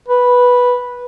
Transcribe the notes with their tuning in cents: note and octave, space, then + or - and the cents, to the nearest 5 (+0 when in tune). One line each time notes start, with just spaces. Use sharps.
B4 -5